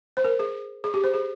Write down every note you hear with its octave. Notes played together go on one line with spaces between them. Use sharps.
C5
A#4
G#4
G#4
G4
C5
G#4